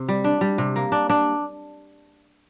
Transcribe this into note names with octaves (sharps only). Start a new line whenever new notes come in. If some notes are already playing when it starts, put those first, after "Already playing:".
Already playing: C3
G3
D4
G3
C3
A#3
D4
D4